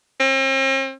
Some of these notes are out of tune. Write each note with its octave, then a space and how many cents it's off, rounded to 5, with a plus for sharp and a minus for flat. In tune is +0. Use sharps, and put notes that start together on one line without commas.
C4 +45